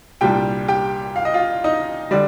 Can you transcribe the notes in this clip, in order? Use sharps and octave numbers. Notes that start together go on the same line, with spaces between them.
C2 A#2 G3 D4 G4 G5
G4 G5
F5
D#5
F4 F5
D#4 D#5
D3 G3 D5